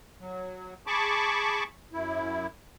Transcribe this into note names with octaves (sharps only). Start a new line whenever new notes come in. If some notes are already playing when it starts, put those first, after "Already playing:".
F#3
G#4 A5 B5 C#6 D6
F#2 E4